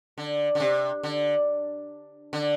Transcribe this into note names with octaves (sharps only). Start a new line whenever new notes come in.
D3
D3
C3
D3
D3